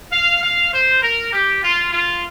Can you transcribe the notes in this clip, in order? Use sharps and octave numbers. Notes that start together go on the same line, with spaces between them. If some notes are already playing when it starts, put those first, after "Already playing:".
F5
F5
C5
A#4
G4
F4
F4